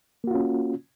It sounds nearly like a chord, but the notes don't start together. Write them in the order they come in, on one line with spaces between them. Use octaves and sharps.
A#3 F#4 F4 C#4